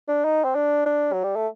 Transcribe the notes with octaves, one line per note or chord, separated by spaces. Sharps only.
D4
D#4
C4
D4
D4
F#3
G3
A3